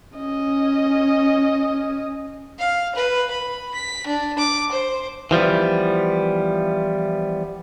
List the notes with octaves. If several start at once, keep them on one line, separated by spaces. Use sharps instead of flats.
C#4 D#5
F5
B4
B5
B6
D4
D6
C5
E3 F3 G3 B3